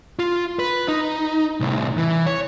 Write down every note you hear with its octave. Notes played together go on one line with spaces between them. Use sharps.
F4
B4
D#4
C2 A2
E3
C#5